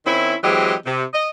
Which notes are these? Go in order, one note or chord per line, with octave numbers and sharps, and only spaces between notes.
D#3 C4 C#4 E4
E3 F#3 G#3 C4 G4 D#5
C3
D#5